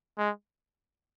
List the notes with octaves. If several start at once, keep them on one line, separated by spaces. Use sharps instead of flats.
G#3